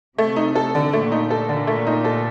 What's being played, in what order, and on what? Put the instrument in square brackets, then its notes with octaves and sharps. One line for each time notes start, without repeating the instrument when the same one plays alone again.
[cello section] C3 [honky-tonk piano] A3
[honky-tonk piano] D#4
A4
D3
[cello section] A#2 [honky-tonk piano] A3
[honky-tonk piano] D#4
A4
D3
A3
D#4
A4